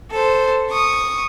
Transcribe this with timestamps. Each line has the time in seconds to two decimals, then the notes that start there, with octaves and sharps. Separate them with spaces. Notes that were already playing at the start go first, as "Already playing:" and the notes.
0.11 A4 C5
0.70 C#6 D#6